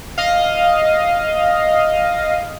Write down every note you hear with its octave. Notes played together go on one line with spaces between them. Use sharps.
D#5 F5